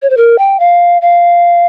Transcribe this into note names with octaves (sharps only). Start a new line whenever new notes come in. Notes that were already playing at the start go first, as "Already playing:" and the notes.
C#5
C5
A#4
G5
F5
F5